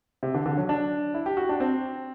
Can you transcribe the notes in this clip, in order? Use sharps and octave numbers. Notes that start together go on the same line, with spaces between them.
C3
D3
D3
F#3
D4
E4
G4
F#4
D4
C4